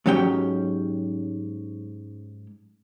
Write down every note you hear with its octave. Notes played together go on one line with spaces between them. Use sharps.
G#2 F#3 C#4 G4 G5